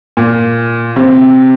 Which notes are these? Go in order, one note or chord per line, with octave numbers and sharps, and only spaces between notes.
A#2
C3